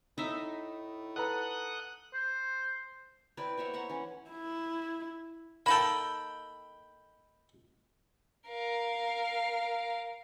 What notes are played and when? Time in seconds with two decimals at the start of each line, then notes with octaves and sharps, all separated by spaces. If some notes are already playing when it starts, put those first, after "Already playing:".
0.18 A2 D#4 E5
1.16 A4 B4 F#5 A#5 D#6 F#6
2.14 C5
3.37 C4 E4 B4 D5
3.57 C5 C#5 E5 F#5
3.73 C#5 E5 F#5 A#5
3.89 E3 C#4
4.30 E4
5.66 A#3 D#4 A4 G5 B5
8.48 A#4 F5